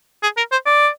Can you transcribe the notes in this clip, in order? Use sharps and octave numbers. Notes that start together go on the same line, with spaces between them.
G#4
A#4
C5
D5